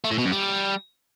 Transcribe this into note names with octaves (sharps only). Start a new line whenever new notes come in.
A3
A2
B2
F#2
G3